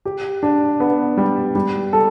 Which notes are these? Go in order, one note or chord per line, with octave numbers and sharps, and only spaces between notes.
G4
D4
B3
G3
G3
A4